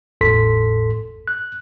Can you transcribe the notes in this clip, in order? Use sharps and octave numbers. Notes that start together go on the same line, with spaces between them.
G#1 E2 A2 A4 C6 B6
F#6